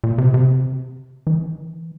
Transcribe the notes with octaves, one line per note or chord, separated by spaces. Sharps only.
A#2
C3
C3
E3